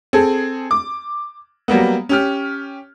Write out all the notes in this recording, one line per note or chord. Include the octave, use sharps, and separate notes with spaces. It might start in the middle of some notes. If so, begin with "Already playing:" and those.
C4 G#4 A4
D6
F#3 G3 A#3 B3
C#4 G4 F6